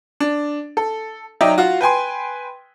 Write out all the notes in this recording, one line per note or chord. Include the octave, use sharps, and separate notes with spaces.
D4
A4
F#3 D#4 D5 E5 G5
F4 F#4
B4 G5 G#5 C6